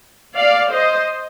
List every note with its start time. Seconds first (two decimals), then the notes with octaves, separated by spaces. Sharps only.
0.37 D5 F5
0.72 C5 D#5